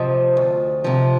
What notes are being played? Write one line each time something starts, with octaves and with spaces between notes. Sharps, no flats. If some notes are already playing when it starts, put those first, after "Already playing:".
Already playing: C3 F3 C5 D#5
D2
C3 F3